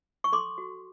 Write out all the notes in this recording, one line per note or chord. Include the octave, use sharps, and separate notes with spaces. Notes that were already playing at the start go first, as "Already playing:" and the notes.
C#6
A4 C6 D6
F#4